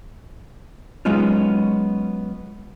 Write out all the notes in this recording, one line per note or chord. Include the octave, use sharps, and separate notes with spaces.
F#3 G#3 B3 C#4 D#4 F4